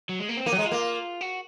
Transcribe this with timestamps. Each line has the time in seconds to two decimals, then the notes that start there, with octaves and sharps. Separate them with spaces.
0.09 F#3
0.19 G#3
0.29 A#3
0.37 C4
0.46 A#3 D#4
0.52 F#3
0.59 G#3
0.66 F4
0.72 A#3
1.21 F#4